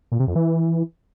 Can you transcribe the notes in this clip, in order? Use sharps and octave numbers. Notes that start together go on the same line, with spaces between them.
A#2
C3
F2
E3